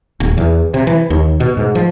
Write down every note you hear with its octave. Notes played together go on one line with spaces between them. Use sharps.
D#1
E2
C3
E3
D#2
B2
G#2
F3